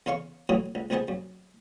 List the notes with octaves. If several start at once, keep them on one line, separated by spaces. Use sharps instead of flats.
E2 C#3 F5 C6 C#6
F#2 A2 E3 F#3 D#6
C#2
C#2 D#3 B3 G#4 C5 A5
F#2